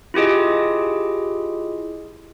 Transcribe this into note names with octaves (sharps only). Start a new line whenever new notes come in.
E4 F4 G4 G#4 D#5